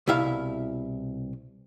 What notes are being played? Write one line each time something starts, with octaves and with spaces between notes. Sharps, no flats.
C2 B2 E4 E5 F5